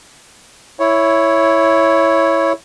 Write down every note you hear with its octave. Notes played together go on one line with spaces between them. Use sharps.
E4 C#5